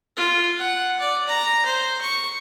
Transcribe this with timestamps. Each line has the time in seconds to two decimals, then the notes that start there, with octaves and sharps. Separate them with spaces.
0.17 F4
0.58 F#5
1.00 D5
1.28 A#5
1.66 C5
2.01 C#6